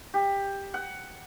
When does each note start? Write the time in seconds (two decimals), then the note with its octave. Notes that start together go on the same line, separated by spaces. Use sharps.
0.14 G4
0.74 F#5